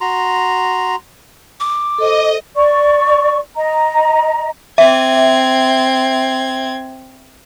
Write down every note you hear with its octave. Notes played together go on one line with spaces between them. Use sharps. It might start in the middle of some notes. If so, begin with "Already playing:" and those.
F#4 A#5 C6
D6
A4 C5 D#5
D5 C#6
D#5 A#5
C4 E5 G#6